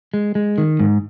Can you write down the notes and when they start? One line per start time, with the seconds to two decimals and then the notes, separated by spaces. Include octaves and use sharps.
0.14 G#3
0.35 G#3
0.58 D#3
0.80 G#2